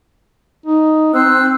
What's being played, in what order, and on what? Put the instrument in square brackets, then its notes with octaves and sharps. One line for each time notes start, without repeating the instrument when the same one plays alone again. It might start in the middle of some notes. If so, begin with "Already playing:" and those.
[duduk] D#4
[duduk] C4 [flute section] C5 E6 F#6